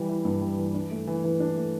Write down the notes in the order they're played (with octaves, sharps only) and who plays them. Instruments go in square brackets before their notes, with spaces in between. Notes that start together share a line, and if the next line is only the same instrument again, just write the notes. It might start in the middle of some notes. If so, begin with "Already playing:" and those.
Already playing: [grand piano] E3 G3
E4
G2
G3
E3
D4
A3
E3
E3
D4
A3